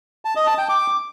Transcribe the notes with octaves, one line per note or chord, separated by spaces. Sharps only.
A5
D#5
A5
G5
D6